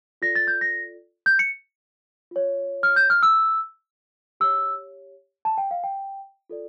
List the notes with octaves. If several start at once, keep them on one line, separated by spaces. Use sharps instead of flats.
F4 A4 D5 A#6
A6
G6
A#6
G6
C#7
F4 C#5
F6
G6
F6
E6
G4 C#5 E6
A5
G5
F5
G5
F4 A4 D5